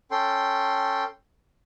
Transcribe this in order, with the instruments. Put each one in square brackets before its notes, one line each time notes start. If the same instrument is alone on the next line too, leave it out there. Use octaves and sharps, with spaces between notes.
[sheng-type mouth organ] C#4 A4 G5 C6